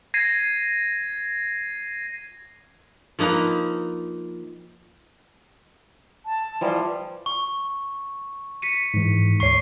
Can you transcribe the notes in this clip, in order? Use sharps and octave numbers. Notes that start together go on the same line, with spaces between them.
G#6 A#6 C7 D#7
F3 A#3 D#4 B4 A#5
A5
E3 F3 G3
C#6
B6 C#7 D#7
G#2 E3
D2 C#5 C#6 C7